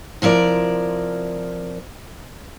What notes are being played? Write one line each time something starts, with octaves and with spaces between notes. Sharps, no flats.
C3 F3 E4 A#4 D5